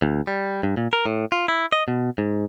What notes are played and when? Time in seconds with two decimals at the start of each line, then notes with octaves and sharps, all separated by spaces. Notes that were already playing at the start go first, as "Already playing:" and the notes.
0.02 D2
0.27 G3
0.63 G2
0.77 A#2
0.93 A#4
1.06 A2
1.32 F4
1.48 E4
1.72 D#5
1.88 B2
2.18 G#2